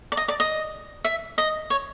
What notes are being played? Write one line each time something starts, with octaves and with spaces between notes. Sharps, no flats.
D5
D#5
D5
D#5
E5
D#5
C#5